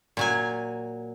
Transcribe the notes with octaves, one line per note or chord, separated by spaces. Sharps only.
A#2 F#3 G#5